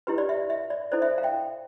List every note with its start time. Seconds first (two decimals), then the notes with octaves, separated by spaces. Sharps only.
0.07 E4 G4 B4
0.18 D5
0.29 E5
0.50 E5
0.70 D5
0.91 E4 A4 C5 D5
1.02 E5
1.18 F5
1.23 E5 G5